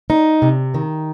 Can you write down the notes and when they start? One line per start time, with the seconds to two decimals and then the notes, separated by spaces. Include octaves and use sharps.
0.10 D#4
0.42 C3
0.74 D#3